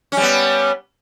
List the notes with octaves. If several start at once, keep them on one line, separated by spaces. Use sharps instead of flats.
G3 B3 C#4